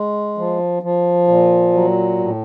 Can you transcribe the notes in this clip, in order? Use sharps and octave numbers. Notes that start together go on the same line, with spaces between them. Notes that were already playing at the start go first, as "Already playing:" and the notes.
Already playing: G#3
F3
F3
A#2
F#3
A2